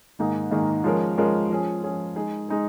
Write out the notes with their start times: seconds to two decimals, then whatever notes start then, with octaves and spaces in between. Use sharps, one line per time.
0.19 G#2 D#3 A#3 D#4 G#4
0.51 G#2 D#3 A#3 D#4 G#4
0.84 F3 G#3 C#4 A#4
1.18 F3 G#3 C#4 A#4
1.50 F3 C#4 G#4
1.84 F3 C#4 G#4
2.16 G#3 D#4 G#4
2.49 G#3 D#4 G#4